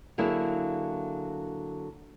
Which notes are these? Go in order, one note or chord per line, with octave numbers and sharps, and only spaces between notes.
D3 F#3 A#3 E4 G#4